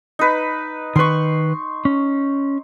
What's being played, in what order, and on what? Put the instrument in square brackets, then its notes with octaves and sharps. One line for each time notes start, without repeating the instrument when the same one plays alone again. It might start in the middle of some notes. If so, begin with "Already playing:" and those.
[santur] D#4 B4
[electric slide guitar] D#3 B4 [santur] C6 C#6
[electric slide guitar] C#4